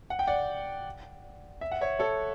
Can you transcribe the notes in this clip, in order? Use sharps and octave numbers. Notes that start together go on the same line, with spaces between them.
F#5
G5
D5 F#5
E5
F#5
C#5 E5
A4 C#5